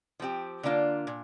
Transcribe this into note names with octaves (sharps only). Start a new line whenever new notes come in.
F3 C4 G4
D3 A#3 D4 F4
A#2